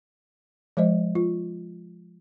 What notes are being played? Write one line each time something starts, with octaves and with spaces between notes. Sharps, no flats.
F3 G#3 C5 D#5
F4